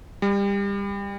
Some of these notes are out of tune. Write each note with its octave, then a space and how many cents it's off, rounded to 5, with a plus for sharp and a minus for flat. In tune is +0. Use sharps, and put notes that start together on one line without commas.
G3 +30